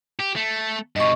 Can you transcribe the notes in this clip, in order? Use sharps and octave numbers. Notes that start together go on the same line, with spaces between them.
G4
A3
G2 B2 D#5 C#6